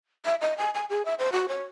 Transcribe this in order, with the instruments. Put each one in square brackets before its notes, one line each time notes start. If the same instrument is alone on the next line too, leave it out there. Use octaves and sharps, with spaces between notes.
[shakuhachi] E5
D#5
G#5
G#5
G#4
E5
C5
F#4
C#5